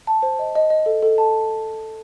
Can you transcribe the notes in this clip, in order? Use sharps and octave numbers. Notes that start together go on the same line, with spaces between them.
A5
C5
D#5
D#5
D#5
A4
A4
A5